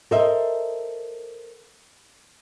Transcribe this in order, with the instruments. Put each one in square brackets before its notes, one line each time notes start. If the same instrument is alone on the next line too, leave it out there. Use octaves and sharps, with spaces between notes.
[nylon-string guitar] A4 A#4 C5 D#5 E5